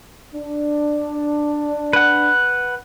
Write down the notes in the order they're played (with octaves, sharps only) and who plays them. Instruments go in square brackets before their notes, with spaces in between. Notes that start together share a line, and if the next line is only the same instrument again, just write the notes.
[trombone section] D4
[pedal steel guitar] B4 F#5